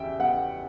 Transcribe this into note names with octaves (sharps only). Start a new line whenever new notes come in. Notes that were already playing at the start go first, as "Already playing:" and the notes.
Already playing: E2 C#3 G3 E5 G5
B3 F#5